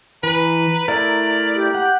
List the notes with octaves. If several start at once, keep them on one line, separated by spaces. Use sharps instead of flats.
E3 B4 A#5
A3 E4 A#4 D5
G4
F#5